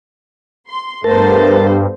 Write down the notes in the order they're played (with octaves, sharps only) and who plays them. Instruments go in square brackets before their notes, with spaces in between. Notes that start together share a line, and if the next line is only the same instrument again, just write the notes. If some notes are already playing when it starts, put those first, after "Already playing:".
[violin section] C6
[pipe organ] G2 [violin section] A3 B3 C5 [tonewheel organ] A#4 A5